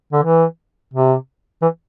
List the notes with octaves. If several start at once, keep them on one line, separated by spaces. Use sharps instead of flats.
D3
E3
C3
E3